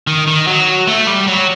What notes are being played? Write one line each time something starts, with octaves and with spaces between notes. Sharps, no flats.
D#3
D#3
F#3
A3
G3
F#3